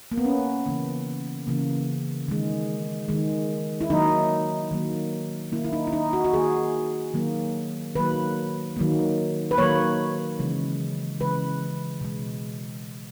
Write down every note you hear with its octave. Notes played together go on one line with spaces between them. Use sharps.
A#3
B3
C#4
C#3 E3 A#3
C#3 E3 A#3
D#3 G#3
D#3 G#3
E4
D#3 F#3 A#3 D#4
D#3 F#3 A#3
D#3 A#3 E4
E4
D#4
E4
D#4
F#4
F#4
D#3 A#3 G#4
D#3 F#3 A#3
D#3 F#3 A#3 B4
D#3 F#3 A#3
B4
D#3 F#3 A#3 C#5
C#3 E3 G#3
C#3 E3 G#3 B4
B2 G#3